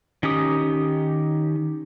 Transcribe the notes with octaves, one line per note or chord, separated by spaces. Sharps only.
D#3 C#4 D#4 G4 D#6